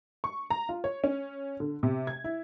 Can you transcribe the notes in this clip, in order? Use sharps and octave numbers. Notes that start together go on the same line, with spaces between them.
C#6
A#5
F4
C#5
C#4
D3
C3
G#6
E4